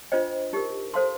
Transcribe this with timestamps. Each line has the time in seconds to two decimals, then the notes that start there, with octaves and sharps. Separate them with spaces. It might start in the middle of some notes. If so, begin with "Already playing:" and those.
0.12 D4 F4 C5 D#5 G5
0.53 D#4 G4 A#4
0.94 A4 C5 F5 A5 C6